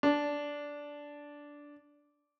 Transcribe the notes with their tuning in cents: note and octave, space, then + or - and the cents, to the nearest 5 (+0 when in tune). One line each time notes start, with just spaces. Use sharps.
D4 -10